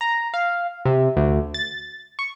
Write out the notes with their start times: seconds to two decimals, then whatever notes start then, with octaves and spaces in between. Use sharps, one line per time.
0.01 A#5
0.34 F5
0.85 C3
1.17 D2
1.54 A6
2.19 C#6